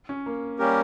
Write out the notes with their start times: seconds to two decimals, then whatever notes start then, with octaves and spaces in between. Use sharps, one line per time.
0.09 C#4
0.26 A#3
0.59 G3 A#3 C#4 G4 A#4